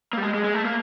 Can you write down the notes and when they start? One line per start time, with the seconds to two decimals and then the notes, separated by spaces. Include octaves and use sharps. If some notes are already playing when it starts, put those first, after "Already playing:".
0.13 A#3
0.18 G3
0.22 G#3
0.34 G#3
0.44 G#3
0.54 A3
0.65 A#3